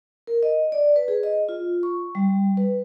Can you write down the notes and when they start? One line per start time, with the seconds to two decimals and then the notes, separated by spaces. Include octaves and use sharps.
0.27 A#4
0.43 D#5
0.72 D5
0.96 B4
1.08 G#4
1.23 D#5
1.49 F4
1.83 C#6
2.15 G3
2.57 B4